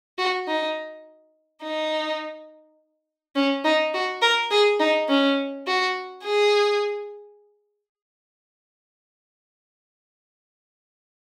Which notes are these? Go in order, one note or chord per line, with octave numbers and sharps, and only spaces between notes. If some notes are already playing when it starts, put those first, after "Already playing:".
F#4
D#4
D#4
C#4
D#4
F#4
A#4
G#4
D#4
C#4
F#4
G#4